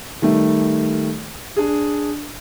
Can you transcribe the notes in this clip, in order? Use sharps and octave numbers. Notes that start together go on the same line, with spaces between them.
D#3 G3 A3
D4 G#4